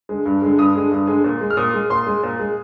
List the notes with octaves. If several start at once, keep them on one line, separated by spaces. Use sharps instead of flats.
D3 G#3
G2
D3 G#3
G2 D#6
D3 G#3
G2
D3 G#3
A#2
G#3
F6
A#2 D#6
G#3
A#2 C6
G#3
A#2
G#3